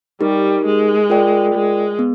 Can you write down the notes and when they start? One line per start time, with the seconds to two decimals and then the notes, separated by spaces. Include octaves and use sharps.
0.21 G3 D#4 G4 A#4
0.66 G#3
1.10 F4 A#4 D5 G5
1.55 G#3
1.99 B3